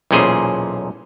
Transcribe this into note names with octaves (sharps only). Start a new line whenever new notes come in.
B1 E2 A#2 C#4 G#4 C5